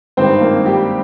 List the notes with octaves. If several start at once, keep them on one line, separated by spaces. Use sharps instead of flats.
G#1 G2 D#3 C4 C5
A#3 A#4
G3 G4